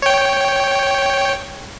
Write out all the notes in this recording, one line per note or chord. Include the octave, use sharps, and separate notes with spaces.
C#5 G5